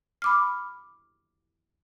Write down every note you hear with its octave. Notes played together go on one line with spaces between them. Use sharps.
B5 D6 F6